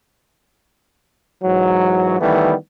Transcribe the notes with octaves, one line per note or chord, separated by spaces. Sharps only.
G#2 E3 F#3
D#3 E3 G3 A3 B3